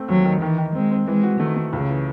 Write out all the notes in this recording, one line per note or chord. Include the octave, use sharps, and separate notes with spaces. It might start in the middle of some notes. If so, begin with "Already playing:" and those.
Already playing: A3 C4
D#2 F#3
D#3
D#3 E3
D#3
G#3 C4
C4
E3 G#3
F#4
D#3 A3
A3
C#2 C#3
E3